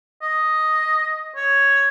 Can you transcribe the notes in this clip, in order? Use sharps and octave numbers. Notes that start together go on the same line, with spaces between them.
D#5
C#5